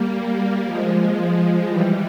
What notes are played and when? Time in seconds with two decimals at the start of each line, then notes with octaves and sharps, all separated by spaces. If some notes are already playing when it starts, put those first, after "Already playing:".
Already playing: G3 A#3
0.14 G3 A#3
0.65 F3 G#3
1.17 F3 G#3
1.68 E3 G3